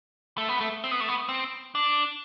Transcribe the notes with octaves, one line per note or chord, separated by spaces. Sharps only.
A3
B3
A3
C4
B3
A3
B3
C4
D4